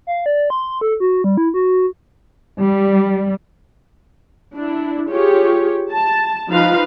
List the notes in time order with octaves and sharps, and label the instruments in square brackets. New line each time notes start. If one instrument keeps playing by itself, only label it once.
[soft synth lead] F5
D5
C6
A4
F#4
G3
E4
F#4
[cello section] G3
[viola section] D4 E4
F4 G4 G#4 C#5
A5
F3 D#4 F4 B4 F5